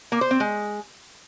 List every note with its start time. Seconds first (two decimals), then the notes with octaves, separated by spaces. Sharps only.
0.12 A#3
0.21 C5
0.31 C4
0.40 G#3